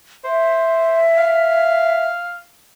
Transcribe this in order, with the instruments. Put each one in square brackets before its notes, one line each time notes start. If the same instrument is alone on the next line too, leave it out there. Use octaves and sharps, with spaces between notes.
[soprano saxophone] C5 [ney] E5
[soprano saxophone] F5